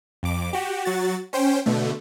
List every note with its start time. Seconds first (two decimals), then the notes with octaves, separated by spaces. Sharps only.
0.23 F2 D6
0.53 F#4 G4
0.85 F#3 F#4 A6
1.33 C#4 C5 G5
1.66 B2 D3 A3